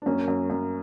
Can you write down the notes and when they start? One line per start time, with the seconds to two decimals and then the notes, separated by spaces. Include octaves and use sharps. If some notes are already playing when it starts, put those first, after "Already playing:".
0.02 D4
0.06 F#2 A#3 C#4
0.28 F#2
0.50 F#2